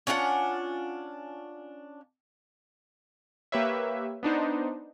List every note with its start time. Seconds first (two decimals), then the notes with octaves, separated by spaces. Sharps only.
0.07 C#4 D4 F4 F#5
3.52 A#3 G4 B4 C#5 E5
4.23 B3 D4 D#4 C5